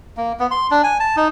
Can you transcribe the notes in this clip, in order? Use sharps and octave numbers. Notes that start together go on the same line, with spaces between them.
A#3
B3
C6
D4
G#5
A5
D#4